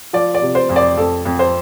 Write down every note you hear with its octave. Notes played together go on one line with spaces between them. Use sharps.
F3 D5
D5
C3
C5
F2
D5
F2 A4
F2
C5